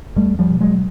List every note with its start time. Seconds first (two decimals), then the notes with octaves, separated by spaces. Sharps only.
0.16 E2 G3 A3
0.39 F3 G3
0.51 B2
0.60 F#3 G#3